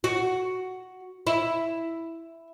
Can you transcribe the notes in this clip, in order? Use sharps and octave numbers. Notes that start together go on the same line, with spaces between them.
F#4
E4